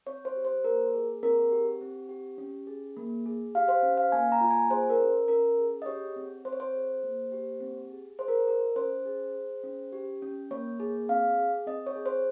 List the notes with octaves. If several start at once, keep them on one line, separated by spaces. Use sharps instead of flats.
C4 C#5
C5
G4
C5
A#3 A#4
G#4
C4 A#4
G4
C4
G4
C#4
G#4
A#3
G#4
G4 F5
C5
C#4
F5
A#3 G#5
A#5
F4
G#5
G#4 C5
A#4
C#4
C#4 A#4
G#4
D#5
G4 C#5
C4
C4 C5
C#5
C5
G#4
A#3
G4
C4
G#4
G#4 C5
A#4
F4 A#4
C#4 C5
G#4
G#4
C#4
G4
C#4
A#3 C#5
G#4
C4 F5
G#4
C4 D#5
C#5
G#4
C5